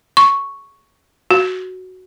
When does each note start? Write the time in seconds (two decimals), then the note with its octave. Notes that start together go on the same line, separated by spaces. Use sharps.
0.17 C#6
1.31 F#4